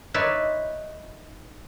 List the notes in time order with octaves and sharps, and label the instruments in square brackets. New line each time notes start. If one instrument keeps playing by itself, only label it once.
[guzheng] D#4 B4 C#5 D5 E5 C6